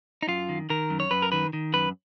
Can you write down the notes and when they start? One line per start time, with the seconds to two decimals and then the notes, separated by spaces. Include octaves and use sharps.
0.23 D#4
0.28 F#2 F4
0.49 D#3
0.70 D#3 A#4
0.90 F#2
1.00 C#5
1.11 F#2 B4
1.22 A#4
1.32 D#3 B4
1.53 D#3
1.74 F#2 B4